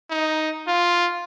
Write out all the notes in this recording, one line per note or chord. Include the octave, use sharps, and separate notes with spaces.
D#4
F4